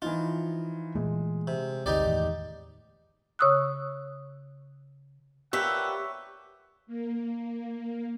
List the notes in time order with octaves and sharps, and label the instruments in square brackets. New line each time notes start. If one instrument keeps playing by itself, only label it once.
[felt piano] E3 F3 D#4 [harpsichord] F4
[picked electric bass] A#2 E3 A3 [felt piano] G#3
[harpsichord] C3
[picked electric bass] G1 D2 C3 [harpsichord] D#4 G4 D5
[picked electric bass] E2 A2 D#3
[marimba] C#3 C#5 C#6 D#6 E6 F#6
[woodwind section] A#2 A5 E6 [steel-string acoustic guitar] G4 B4 [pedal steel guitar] C#5 E5 [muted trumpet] F#5
[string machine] A#3